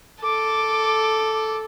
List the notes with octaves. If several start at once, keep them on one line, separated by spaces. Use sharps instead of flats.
A4 D6